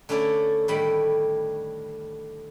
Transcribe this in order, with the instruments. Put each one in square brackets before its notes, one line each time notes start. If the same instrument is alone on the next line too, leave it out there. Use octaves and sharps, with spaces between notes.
[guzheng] D3 A3 C#4 E4 D5
A2 D3 D#3 G3 B5